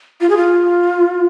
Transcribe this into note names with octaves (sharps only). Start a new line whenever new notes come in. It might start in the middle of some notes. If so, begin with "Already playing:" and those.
F4
G#4
F4